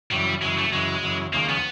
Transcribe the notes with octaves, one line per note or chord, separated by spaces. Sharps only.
F#2 C#3 E3 G3
F#2 C#3 E3 G#3
A3
F#2 C#3 E3 G#3
F#2 C#3 E3
D#2 C#3 F3 G#3 A#3
B3